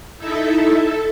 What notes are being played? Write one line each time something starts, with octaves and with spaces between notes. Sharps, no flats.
D#4 E4 A4 E5
A4